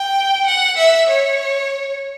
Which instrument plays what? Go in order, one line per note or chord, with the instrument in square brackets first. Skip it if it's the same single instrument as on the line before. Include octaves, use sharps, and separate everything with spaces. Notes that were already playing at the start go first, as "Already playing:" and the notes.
Already playing: [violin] G5
F#5
E5
C#5